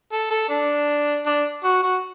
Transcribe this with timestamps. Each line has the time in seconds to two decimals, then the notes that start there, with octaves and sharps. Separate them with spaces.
0.12 A4
0.30 A4
0.49 D4
1.26 D4
1.64 F#4
1.83 F#4